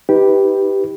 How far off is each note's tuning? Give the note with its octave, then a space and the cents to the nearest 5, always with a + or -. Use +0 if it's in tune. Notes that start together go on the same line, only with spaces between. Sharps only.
D#4 +25 G4 +0 B4 +0